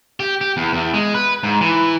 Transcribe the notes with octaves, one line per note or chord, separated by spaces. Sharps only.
G4
G4
E2
E2
G#3
B4
G#2
E3